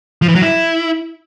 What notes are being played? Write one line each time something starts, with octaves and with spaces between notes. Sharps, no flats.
F3
E3
F#3
E4